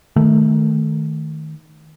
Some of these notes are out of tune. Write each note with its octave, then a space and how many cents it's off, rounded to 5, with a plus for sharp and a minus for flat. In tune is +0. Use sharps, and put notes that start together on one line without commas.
D#3 +0 A3 -10